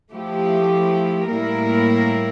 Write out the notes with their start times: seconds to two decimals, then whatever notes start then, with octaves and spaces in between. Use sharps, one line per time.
0.12 F3 A3 E4 G4
1.29 A2 G3 A#3 E4 A#4